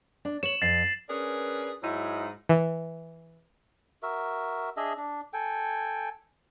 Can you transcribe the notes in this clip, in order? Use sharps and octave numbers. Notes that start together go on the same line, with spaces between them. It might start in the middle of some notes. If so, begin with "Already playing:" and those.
D4
C#5 E7 F#7
F2 A6 C7
C#4 D4 G#4 A#4 B4
G#2 F#3 D#4 E4
E3
F#4 A#4 E5
D4 G#4 D#5 E5
D4
A4 G5 G#5